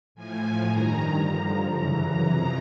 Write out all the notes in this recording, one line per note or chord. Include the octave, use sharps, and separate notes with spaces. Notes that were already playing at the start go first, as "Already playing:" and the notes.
A2 F3 G#5
G2 D#3 A#5
G2 D3 F3
F#2 C#3 E3
F2 C3 F3